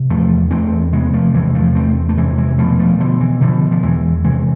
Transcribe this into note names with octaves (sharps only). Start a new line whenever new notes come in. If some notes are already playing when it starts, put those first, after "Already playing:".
Already playing: C3
E2 F3 A3
E2 A3 C4
C3 G#3 B3
F3 A3
E2 E3 G#3
F3 A3
E2 A3 C4
A3
C3 E3 G#3
E3 G#3
B2 F3 A3
F3 A3
B2 D3 F3
E3
B2 D3 F3
F3
E2 E3 G#3
C3 E3 G#3